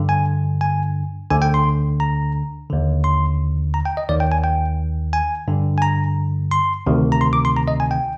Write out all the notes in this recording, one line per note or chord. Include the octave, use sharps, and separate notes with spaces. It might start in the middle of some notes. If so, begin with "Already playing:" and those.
Already playing: G2 D3
G#5
G#5
D2 D3 G#5
G5
C6
A#5
D#2 D3
C6
A#5
G5
D#5
D#2 D#3 D5
G5
G#5
G5
G#5
G2 D3
G#5
A#5
C6
D2 C3 D#3
A#5
C6
D6
C6
A#5
D#5
G#5
G5